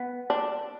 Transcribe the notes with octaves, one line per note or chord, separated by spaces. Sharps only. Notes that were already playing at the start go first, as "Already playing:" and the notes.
Already playing: B3
D4